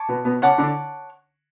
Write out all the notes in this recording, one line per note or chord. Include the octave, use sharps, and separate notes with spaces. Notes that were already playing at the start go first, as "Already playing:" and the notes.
Already playing: C#5 A5 D6
B2 B3
B2 B3
C#3 C#4 C#5 F#5 A5 D6
D3 D4